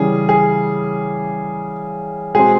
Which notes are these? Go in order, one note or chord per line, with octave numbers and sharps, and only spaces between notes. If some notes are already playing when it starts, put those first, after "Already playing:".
Already playing: C#3 E3 G3 G#4
G#4
B2 G#3 C4 G#4